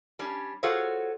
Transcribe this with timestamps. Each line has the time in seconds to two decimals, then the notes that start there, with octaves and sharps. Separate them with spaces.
0.19 G3 C#4 D4
0.63 F4 F#4 G#4 A4 C5 C#5